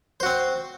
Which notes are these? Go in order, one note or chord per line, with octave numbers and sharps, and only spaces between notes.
C4 F#4 C5